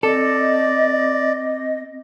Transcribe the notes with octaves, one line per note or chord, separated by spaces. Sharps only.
C4 A4 D5 D#5